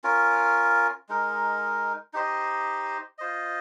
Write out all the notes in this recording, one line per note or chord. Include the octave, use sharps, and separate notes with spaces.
C#4 F4 A#4
G#3 D#4 A#4
D#4 G4 C5 D#5
F4 C5 D#5